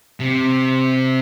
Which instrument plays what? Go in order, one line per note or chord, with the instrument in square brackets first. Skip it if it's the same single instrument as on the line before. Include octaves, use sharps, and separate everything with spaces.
[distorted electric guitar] C3